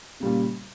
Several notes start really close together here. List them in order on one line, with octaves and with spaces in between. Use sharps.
C#3 G3 A#2